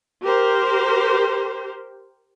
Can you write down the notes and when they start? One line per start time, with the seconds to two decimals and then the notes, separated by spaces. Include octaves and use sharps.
0.23 G4 A#4 C5